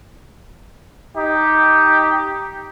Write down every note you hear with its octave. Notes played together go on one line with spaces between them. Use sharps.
D#4 G4